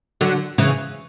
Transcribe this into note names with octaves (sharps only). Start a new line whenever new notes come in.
D3 F#3
C#3 E3